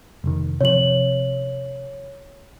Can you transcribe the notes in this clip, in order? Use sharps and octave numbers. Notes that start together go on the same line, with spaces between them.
F1 D#3
C3 F3 C#5 F#7